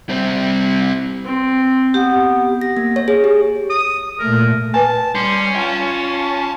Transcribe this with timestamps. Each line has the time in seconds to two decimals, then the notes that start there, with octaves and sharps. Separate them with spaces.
0.09 G3 C4
1.24 C4
1.94 B3 G4
2.61 A#6
2.77 A#3
2.96 C#5
3.08 G#4
3.24 G4
3.70 D#6
4.19 A#2 A3 A#4
4.74 B4 G#5 A5
5.15 G3 C#4 C6
5.56 F4 G5 A5